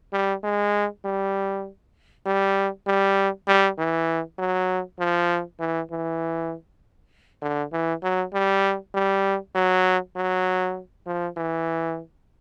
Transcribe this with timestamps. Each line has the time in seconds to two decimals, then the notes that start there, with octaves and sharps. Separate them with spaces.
0.13 G3
0.44 G#3
1.05 G3
2.26 G3
2.87 G3
3.48 G3
3.78 E3
4.38 F#3
4.99 F3
5.60 E3
5.91 E3
7.42 D3
7.72 E3
8.03 F#3
8.33 G3
8.94 G3
9.55 F#3
10.16 F#3
11.06 F3
11.37 E3